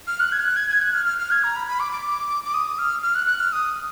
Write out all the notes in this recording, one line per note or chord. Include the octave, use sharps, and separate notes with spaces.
F6
F#6
G#6
F6
F#6
G#6
G#6
F#6
F6
F6
F6
G#6
A#5
B5
B5
D6
D6
D6
D#6
F6
F6
F#6
F#6
F6
D#6